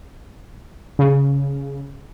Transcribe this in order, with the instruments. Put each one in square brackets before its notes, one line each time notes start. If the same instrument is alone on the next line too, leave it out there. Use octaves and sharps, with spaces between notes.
[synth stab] C#3